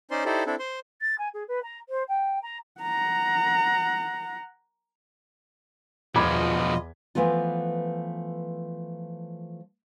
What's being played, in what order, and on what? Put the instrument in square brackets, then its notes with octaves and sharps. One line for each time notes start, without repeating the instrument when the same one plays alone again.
[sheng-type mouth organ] C#4 D#4 C5 D5 C6
D#4 E4 G4 A4 C5 D5
C4 D4 E4 A4
C5 C6
[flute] A6
G#5
G#4
B4
A#5
C5
G5
A#5
[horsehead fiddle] F#5 A#5
[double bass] E2 [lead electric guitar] B2 F3 [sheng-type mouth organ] F4 D#5 [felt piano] B5 D6 G#6
[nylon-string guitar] E3 F3 A3 B3 F4